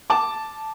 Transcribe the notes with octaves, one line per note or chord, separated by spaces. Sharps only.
A5 D6